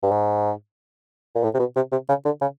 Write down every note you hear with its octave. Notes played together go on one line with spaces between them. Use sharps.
G2
G#2
A#2
A2
C3
B2
C3
C3
C#3
D3
C#3